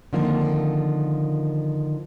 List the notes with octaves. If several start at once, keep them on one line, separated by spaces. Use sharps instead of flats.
D3 D#3 F3 A#3 C4